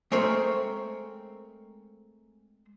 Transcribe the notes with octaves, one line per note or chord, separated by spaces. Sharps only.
G#3 A3 C4 A#4 C5 C#5